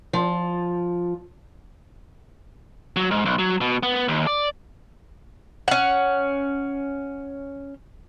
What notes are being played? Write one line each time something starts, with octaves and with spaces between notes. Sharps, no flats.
F3
F#3
G#2
B1
F#3
B2
B3
D#2
D5
C#4 F#5